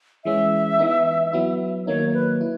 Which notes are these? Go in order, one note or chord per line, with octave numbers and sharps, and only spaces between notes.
E3 G#3 C#4 E5
E3 B3 D#4
F#3 B3 E4
D#3 F#3 A#3 D#4 C#5
B4
E4